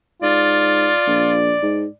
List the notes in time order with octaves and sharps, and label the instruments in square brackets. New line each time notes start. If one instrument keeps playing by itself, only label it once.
[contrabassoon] G#2 [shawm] F4 [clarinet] D5
[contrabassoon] A#1
G#2